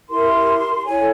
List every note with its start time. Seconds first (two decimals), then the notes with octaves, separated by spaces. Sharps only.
0.08 E4 G4 A#4 C6
0.85 E4 A4 C#5 G#5